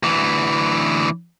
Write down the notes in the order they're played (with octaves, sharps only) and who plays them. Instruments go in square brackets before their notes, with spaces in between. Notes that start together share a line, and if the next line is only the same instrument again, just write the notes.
[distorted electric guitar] D2 E3